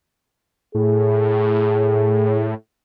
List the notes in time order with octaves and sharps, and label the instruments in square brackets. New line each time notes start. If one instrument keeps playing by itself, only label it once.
[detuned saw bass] A2 [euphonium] G#4